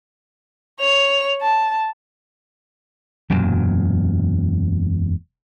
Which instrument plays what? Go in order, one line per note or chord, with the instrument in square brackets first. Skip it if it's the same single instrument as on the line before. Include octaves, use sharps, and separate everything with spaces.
[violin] C#5 F7
A5
[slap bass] E1 F#2 A#2 F#3